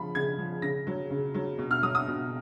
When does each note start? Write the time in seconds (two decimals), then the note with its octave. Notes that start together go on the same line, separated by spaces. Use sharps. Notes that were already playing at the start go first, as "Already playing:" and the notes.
Already playing: C#3 F3 B5
0.15 C#3 G#6
0.38 F3
0.62 C#3 A#6
0.87 F#3
1.10 C#3
1.34 F#3
1.58 B2
1.71 F6
1.82 F#3 D#6
1.95 D#6
2.07 B2